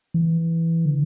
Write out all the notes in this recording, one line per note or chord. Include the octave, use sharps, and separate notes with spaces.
E3
D3